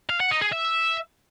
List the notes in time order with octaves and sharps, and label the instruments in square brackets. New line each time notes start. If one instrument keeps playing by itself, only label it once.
[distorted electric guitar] F5
F#5
D#4
G#4
E5